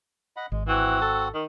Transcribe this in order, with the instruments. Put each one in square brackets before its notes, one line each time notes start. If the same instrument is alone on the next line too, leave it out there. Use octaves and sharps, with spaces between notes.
[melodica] D#5 F#5 B5
[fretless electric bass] G#1 [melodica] G#3
[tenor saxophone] E3 [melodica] C4 F#4 F#5
[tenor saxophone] A4
D#3